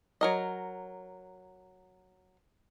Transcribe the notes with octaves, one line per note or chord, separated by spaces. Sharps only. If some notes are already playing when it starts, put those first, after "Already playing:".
F#3 A#4 D#5